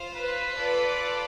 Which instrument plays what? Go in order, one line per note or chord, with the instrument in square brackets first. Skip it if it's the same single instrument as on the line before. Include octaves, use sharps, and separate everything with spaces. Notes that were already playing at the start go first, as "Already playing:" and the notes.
Already playing: [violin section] F4 C5 F5
[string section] B4
[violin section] F4 A4 D5